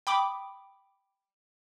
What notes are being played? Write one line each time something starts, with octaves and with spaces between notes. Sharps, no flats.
G5 B5 D6 D#6